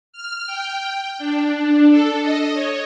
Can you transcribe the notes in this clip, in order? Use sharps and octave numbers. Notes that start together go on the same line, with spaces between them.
F6
G5
D4
A4
D#5
C#5